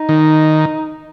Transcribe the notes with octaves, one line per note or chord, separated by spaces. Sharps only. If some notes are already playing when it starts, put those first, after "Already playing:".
Already playing: D#4
D#3